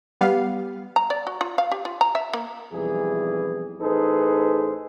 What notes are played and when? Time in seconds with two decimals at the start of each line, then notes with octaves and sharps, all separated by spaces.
0.21 G3 B3 F5
0.96 A#5
1.10 D5
1.27 F#4
1.41 F4
1.58 F5
1.72 G4
1.85 F4
2.01 A#5
2.15 E5
2.33 A#3
2.72 B1 F2 E3 G3 G#4
3.81 A1 D#4 G#4 A4 B4 C5